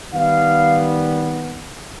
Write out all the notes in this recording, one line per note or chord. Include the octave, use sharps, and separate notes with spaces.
D#3 G3 B3 F5